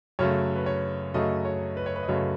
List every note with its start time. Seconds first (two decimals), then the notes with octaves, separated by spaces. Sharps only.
0.19 F#2 C#3 F#3 A3 C#5
0.56 B4
0.66 C#5
1.14 F#2 C#3 F#3 A3 D#5
1.45 C#5
1.77 B4
1.86 C#5
1.96 B4
2.03 D#5
2.08 F#2 C#3 F#3 A3 C#5